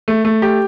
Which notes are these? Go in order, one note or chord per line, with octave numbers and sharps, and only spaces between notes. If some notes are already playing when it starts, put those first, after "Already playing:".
A3
A3
G4